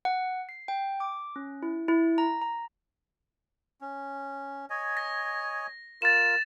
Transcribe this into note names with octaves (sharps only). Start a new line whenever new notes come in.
F#5
C7
G5
D6
C#4
E4
E4
A#5
A#5
C#4
C#5 D#5 G#5
A#6
F4 A#4 A6 E7